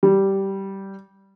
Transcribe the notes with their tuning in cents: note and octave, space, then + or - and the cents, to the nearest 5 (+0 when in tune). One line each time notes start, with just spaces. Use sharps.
G3 -10